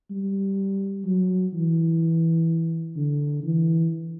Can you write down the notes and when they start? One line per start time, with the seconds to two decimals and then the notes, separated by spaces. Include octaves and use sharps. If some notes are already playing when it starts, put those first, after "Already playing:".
0.11 G3
1.06 F#3
1.53 E3
2.96 D3
3.44 E3